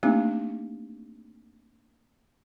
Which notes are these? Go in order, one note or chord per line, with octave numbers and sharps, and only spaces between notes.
A3 A#3 C4 D4 D#4 G4